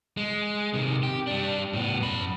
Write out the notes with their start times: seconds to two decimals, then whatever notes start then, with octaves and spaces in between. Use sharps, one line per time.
0.17 G#3
0.74 C3 D#3
1.03 G4
1.27 G3 D4
1.73 A2 B3
2.00 F#2 B5